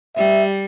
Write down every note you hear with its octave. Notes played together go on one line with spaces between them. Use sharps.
G3 E5